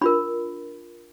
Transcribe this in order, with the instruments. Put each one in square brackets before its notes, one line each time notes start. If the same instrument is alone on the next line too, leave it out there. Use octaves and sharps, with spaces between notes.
[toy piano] D4 F4 A#4 B5